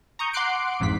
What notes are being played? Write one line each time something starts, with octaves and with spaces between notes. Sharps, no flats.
A#5 C#6 D#6 G6
F#5 C6 D6 F#6 C7 D7
A1 F2 G#2 B6